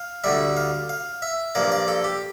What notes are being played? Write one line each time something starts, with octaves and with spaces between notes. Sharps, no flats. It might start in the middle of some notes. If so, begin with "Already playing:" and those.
Already playing: F5
D2 D3 G3 E5
F5
F5
E5
G2 F3 A#3 D5
D5
A4
G4